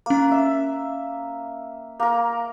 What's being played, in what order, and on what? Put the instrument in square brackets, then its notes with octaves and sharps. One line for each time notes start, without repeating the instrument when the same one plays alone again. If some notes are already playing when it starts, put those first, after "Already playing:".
[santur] A#3 [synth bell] C#4 A#5
[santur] E5
A#3 A#4